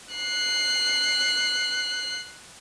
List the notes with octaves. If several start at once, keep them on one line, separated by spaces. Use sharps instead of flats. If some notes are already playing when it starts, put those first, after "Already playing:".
F#6 C7